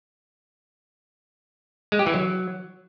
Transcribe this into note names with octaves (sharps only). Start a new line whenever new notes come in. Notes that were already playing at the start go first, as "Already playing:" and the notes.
G#3
G4
E3
F#3